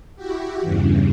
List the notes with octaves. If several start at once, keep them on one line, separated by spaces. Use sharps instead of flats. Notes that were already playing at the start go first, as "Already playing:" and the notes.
E4 F#4 G4
E2 G2 C#3 E3